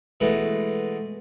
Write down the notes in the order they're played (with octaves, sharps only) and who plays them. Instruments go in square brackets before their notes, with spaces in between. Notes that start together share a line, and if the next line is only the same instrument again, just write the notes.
[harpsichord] B2 E3 G#3 A3